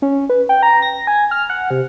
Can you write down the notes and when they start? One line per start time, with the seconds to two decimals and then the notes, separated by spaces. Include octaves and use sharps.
0.02 C#4
0.29 B4
0.49 G5
0.63 A#5
0.82 A#6
1.07 G#5
1.31 F6
1.50 F#5
1.70 C3